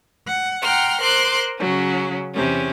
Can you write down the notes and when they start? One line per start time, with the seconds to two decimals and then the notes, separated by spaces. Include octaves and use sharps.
0.25 F#5
0.62 F#5 G5 A#5 C6 F6
1.01 A#4 C5 C6 D6 F#6
1.58 C#3 F#3 C#4
2.34 E2 C3 C#4